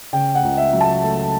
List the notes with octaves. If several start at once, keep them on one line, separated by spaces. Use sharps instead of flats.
C#3 G5
F#5
C#2
E5
F#3
A5
A3